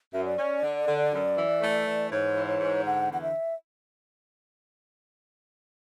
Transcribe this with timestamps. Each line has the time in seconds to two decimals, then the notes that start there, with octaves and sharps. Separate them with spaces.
0.13 F#2 E5
0.25 D5
0.37 C#4
0.62 D3
0.87 D3
1.12 F#2
1.36 E3
1.61 A3
1.85 E3
2.11 G#2 C#5
2.36 E3
2.47 C#5
2.60 G#2
2.84 D3 F#5
3.09 E2 F#5
3.22 E5